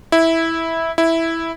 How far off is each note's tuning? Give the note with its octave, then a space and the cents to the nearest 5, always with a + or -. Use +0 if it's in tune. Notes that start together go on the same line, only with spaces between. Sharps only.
E4 -10
E4 -5